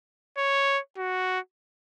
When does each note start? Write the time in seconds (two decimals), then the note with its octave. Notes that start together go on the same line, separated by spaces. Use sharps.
0.38 C#5
0.97 F#4